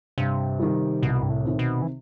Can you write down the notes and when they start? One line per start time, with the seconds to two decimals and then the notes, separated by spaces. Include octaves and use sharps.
0.18 G2 C3
0.60 D#3 G3
1.03 C2 B2
1.23 G2
1.30 A2
1.45 C3 D#3
1.59 B2
1.82 E3